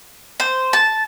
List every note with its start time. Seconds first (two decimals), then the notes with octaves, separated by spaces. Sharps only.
0.40 C5
0.73 A5